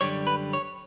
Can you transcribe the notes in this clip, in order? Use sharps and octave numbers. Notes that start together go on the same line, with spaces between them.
F#2 D3 G3 C#5
B4
C#5